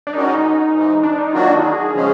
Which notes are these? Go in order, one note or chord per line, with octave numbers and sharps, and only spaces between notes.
D4
D#3 G#3 C#4 D#4 F#4
D#4
G#2 E3 G#3
D4
D#4
D#3 F#3 A#3 D4 F4 F#4
D#4
G#4
C#3 F3 G#3 C#4